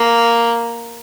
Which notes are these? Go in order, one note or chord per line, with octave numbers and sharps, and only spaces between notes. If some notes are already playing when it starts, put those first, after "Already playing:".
Already playing: A#3